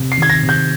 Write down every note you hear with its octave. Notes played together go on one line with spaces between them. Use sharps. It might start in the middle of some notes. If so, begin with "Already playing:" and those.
Already playing: C3
C7
D#3 G#6
A#6
C3
G6